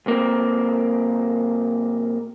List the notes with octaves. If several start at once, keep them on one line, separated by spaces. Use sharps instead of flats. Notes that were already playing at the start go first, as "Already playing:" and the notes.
B1 A#3 C4